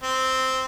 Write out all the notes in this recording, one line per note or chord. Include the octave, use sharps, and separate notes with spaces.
C4